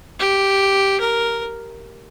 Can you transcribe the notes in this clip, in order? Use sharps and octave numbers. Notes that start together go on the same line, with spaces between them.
G4
A#4